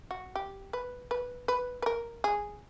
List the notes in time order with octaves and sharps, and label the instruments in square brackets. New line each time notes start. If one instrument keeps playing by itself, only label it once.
[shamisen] F#4
G4
B4
B4
B4
B4
A#4
G#4